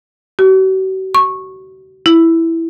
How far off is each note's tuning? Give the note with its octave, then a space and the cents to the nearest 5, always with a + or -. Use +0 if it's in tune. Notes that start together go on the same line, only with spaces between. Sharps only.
F#4 +45
C#6 -15
E4 +0